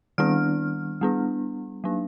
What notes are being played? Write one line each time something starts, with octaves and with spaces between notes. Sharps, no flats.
D#3 G3 B3 D4 F6
G3 B3 D4
F#3 A#3 D4